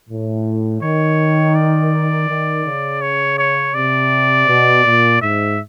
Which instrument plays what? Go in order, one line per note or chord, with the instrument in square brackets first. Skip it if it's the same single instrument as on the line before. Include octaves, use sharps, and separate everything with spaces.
[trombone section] A2
[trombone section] D#3 [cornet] C#5
[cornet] D5
[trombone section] D#3
C#3
[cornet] C#5
C#5
[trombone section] C3 [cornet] D5
[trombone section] B2
A#2
[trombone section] G#2 [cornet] E5